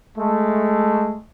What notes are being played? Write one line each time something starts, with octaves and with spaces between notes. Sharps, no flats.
G#3 A3